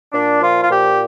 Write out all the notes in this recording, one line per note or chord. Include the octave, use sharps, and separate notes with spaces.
A#2 D4
F3 F4
F4
A#2 G4